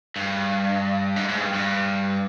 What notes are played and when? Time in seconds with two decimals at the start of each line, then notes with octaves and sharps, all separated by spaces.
0.16 G2
1.16 G#2
1.29 G#2
1.40 G2
1.54 G2